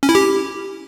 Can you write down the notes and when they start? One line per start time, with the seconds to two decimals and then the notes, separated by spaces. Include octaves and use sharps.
0.03 C#4
0.09 E4
0.15 G4